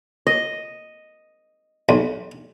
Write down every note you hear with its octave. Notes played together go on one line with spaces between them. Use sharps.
D#5
B1